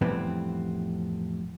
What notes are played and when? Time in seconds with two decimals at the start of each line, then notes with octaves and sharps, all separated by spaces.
0.01 F2 A2 E3 G3 B3 C4